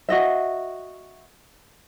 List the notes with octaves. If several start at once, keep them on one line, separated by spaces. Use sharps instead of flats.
F#4 D#5 E5